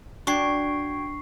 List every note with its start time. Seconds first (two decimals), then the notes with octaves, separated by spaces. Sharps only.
0.27 D4 F#4 G5 C#6 G#6 C7